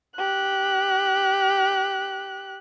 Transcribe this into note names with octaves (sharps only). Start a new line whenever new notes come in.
G4 F#6